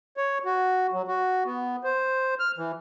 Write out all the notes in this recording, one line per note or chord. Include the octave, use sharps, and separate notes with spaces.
C#5
F#4
F#3
F#4
B3
C5
F6
E3